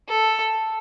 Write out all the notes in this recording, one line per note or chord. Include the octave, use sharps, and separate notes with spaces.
A4